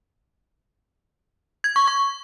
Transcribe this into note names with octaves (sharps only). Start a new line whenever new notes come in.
G#6
C#6
C#6